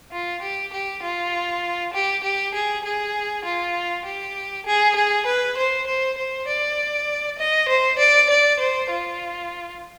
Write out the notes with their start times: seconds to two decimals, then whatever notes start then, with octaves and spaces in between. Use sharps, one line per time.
0.12 F4
0.42 G4
0.73 G4
1.02 F4
1.93 G4
2.24 G4
2.54 G#4
2.84 G#4
3.45 F4
4.05 G4
4.66 G#4
4.96 G#4
5.26 B4
5.57 C5
5.87 C5
6.18 C5
6.47 D5
7.39 D#5
7.68 C5
7.99 D5
8.30 D5
8.59 C5
8.90 F4